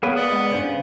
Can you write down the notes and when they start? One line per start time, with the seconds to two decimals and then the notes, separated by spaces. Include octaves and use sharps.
0.03 A#3 B3 G#4 B4 C#5
0.16 B3 D5 D#6
0.32 G#3 A#4 F#5
0.50 G2 C#3 C5 D7